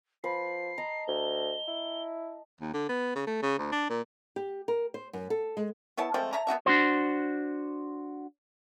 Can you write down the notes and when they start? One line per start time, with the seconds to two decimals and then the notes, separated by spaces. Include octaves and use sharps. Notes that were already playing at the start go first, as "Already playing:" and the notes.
0.24 F3 B4 C7
0.78 D#5 A5 A#5
1.08 D2 G7
1.68 E4
2.61 D#2
2.74 D3
2.89 B3
3.16 C#3
3.27 A3
3.42 C#3
3.58 D2
3.72 D4
3.90 A#2
4.36 G4
4.68 A#4
4.94 C5
5.13 F#2
5.30 A4
5.57 G#3
5.97 B3 E4 C#5 A5
6.14 F3 G#3 A3 C4
6.33 C#5 E5 A5 A#5
6.47 B3 D#4 F#4 E5
6.66 D4 F#4 C5